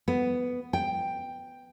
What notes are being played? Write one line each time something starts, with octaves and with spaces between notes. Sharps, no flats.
B3
G5